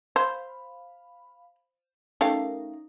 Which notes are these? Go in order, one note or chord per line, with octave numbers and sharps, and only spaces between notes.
C5 F5 B5
A3 C#4 D#4 G4 A#4 F5